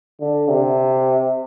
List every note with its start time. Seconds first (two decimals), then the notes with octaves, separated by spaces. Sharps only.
0.21 D3
0.49 C3